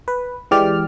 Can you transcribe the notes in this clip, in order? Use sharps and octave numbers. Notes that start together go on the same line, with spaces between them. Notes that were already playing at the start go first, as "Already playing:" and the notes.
B4
E3 G#3 G4 D5 F6